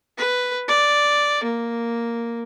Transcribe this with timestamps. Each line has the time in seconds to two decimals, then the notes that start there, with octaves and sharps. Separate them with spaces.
0.18 B4
0.68 D5
1.44 A#3